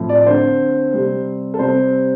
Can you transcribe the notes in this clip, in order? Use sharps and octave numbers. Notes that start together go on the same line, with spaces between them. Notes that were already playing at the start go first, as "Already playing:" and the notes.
Already playing: A2 F3 C4
D5
D5
D3 A3 C4 C5
C3 G3 C4
A4
C3 G3 C4 C5